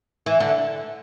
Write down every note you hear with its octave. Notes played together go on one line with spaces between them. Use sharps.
E3
D3